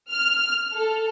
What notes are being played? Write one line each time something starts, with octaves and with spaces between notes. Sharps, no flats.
F6
A4